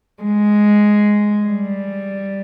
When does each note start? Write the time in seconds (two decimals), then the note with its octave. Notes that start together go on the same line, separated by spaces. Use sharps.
0.22 G#3
1.46 G3